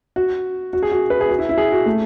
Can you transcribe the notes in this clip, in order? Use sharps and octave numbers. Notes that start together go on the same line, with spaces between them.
F#4
F#4
G#4
F#4
B4
G#4
F#4
E4
E4
G#4
F#4
A3